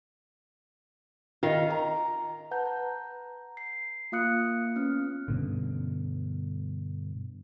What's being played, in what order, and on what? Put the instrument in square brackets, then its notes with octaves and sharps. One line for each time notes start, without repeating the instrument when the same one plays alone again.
[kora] D#3 F5 [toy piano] F4 D#5
[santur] A#5
[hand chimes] B4 F#5 A5 A#5 G6
A#5
C7
A#3 F4 F5 D#6 F#6 C#7
B3 C#4 F6
[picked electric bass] G2 B2 D3